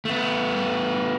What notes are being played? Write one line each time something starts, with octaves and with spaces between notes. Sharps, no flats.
A3 B3